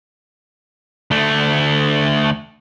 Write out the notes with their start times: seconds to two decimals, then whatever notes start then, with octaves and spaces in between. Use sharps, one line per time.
1.11 D2 A3